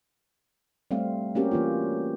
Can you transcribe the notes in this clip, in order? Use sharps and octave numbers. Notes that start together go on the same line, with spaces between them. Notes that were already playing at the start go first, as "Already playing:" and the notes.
G3 A3 C4 F5
A#3 C4 C#4 F#4 G4 A#4
E3 A#3 F4